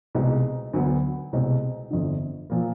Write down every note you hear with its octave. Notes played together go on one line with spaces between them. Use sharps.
C2 B2 G#3 C4 D#4
D2 D3 F#3 B3
C2 B2 G#3 C4
G1 F2 D3
A#2 F3 A#3